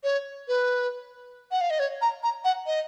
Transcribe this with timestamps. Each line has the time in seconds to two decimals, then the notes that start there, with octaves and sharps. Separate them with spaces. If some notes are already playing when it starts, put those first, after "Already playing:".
0.04 C#5
0.48 B4
1.51 F#5
1.61 F5
1.70 D#5
1.79 C#5
2.01 A#5
2.23 A#5
2.44 F#5
2.66 D#5